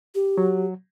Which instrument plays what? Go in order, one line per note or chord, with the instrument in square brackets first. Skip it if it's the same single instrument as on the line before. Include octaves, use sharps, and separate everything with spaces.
[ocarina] G4
[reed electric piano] F#3